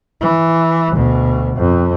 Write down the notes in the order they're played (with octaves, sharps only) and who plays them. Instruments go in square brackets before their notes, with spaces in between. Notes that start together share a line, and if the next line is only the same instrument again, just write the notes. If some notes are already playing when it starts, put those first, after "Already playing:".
[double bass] E3
D2 B2
F2